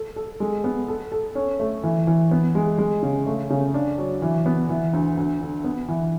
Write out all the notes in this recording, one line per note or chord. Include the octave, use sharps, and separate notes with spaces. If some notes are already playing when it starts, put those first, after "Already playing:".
Already playing: A4
A4
G#3
B3
A4
A4
C#4
A3
E3
E3
B3
G#3
G#3
C#3
A3
C#3
D4
F#3
E3
B3
E3
D2
D2
D3
B3
E3